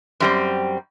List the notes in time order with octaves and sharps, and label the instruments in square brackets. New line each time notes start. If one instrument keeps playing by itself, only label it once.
[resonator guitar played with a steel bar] F#2 G3 C4